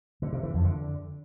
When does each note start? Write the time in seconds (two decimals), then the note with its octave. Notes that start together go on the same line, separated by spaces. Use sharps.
0.22 D3
0.33 C3
0.43 E3
0.54 F2
0.64 D3